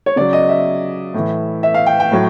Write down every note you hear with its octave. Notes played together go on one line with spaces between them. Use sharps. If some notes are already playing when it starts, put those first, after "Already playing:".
C#5
C#3 F#3 D5
D#5
E5
A2 E3
E5
F5
G5
G5
A2 F#3